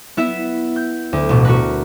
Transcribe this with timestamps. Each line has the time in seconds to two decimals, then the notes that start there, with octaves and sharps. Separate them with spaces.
0.17 B3 E4 E5
0.76 G6
1.13 D2
1.29 A1 B2
1.45 F#4 A#4 B4